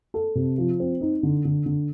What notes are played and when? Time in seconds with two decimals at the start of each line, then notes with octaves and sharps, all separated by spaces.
0.14 A4
0.35 C3
0.58 F3
0.80 C4
1.01 D#4
1.23 D3
1.45 D3
1.66 D3